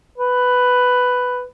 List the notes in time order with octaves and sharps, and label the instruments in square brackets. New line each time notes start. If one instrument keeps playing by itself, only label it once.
[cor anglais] B4